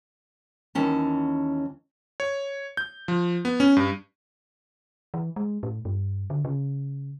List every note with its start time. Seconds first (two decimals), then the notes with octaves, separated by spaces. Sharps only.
0.75 D#2 E3 C#4 A5
2.20 C#5
2.77 G6
3.08 F3
3.45 B3
3.60 C#4
3.77 G2
5.14 E3
5.36 G#3
5.63 A2
5.85 G2
6.30 D3
6.45 C#3